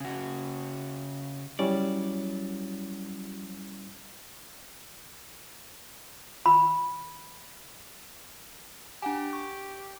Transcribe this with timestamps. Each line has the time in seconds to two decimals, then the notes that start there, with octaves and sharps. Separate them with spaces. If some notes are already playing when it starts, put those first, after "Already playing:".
0.01 C#3 F#4
1.59 F#3 G3 C#4 E4 D5
6.46 B5
9.02 D4 G4 F#5 G#5
9.33 C#6